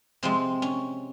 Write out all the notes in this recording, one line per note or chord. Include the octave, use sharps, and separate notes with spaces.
C3 F3 G#3 C4
C#4